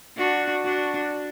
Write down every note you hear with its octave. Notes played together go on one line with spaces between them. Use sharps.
D4 F#4
D4 F#4